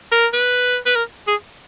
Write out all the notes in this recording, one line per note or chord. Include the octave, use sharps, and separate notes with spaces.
A#4
B4
B4
A#4
G#4